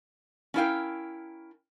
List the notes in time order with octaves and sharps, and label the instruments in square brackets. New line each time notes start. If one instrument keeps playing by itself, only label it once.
[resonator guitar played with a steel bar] C#4 D4 E4 A#4 F5 G5